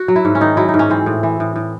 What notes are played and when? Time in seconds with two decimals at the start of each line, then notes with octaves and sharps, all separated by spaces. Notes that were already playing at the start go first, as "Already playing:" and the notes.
Already playing: F#4
0.08 F#3
0.16 E4
0.25 G#2
0.35 C#4
0.41 D#3 D#4
0.57 F#3 E4
0.69 D#4
0.74 G#2
0.79 C#4
0.90 E3 C4
1.06 A2
1.23 E3
1.40 A2
1.56 A2